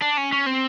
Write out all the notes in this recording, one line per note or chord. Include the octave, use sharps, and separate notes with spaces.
D4
C#4
C#4
C4